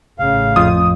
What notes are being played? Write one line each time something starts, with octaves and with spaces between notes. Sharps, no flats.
A1 C#3 F5
F2 F4 D#6